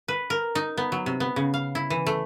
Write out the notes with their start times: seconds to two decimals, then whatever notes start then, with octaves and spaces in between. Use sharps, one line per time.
0.08 B4
0.30 A#4
0.55 D#4
0.77 B3
0.92 F#3
1.06 C3
1.20 B3
1.36 C#3
1.54 F5
1.75 E4
1.90 E3
2.06 A3